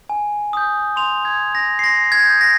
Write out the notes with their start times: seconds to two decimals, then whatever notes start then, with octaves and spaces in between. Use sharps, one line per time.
0.10 G#5
0.53 D#6 G6
0.96 C6 F7
1.25 G#6
1.39 D#6 G6
1.55 A#6
1.79 C7
1.84 C6 A#6
2.12 G#6
2.26 D#6 G6
2.41 A#6